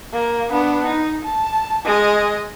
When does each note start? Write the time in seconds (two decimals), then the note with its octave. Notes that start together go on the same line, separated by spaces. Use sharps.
0.13 A#3
0.51 B3 D4
0.85 D#4
1.25 A5
1.85 G#3 D#5